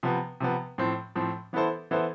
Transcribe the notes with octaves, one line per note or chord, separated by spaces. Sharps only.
C3 F3 B3
C3 F3 B3
A2 F3 C4
A2 F3 C4
E3 B3 E4 A4 C5
E3 B3 E4 A4 C5